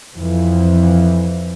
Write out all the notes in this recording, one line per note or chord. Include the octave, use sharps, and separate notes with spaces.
F2 E3 F3